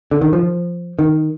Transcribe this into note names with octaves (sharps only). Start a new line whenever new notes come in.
D3
D#3
F3
D#3